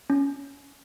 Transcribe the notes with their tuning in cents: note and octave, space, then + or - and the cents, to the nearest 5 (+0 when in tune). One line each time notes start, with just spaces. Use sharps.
C#4 +10